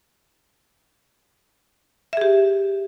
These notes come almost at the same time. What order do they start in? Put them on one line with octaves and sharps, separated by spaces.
E5 G#4 G4